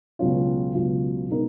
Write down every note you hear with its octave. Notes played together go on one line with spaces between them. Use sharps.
C#2 B2 F#3 C#4 F4
C#2 B2 F#3 C#4 F4
B2 G#3 D#4 A#4